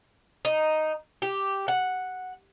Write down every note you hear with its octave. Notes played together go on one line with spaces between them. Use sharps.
D#4
G4
F#5